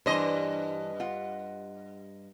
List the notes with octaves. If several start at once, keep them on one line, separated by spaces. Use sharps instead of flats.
G2 E3 D4 C5 D#5
F4 F#5